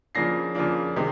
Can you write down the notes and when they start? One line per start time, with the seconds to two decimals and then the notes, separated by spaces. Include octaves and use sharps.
0.15 C#3 F3 A#3 D4 A#6 C7
0.55 C#3 F3 A#3 D4
0.96 C3 D#3 G#3